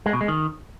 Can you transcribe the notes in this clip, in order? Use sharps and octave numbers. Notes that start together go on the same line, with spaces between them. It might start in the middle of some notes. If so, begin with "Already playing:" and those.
G#3
B2
G#3
D#3